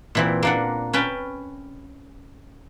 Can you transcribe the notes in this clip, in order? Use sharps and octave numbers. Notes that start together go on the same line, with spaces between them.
A#2 E3 C4
A#3 D4 F#5
C#4 B4 G5 A5